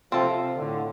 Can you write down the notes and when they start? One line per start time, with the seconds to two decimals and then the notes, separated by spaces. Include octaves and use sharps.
0.12 C3 F3 C4 F4 A4
0.58 A2 D3